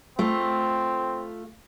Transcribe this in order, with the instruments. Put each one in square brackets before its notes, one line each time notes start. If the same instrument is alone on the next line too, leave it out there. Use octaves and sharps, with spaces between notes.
[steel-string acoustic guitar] A3 F4 [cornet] C4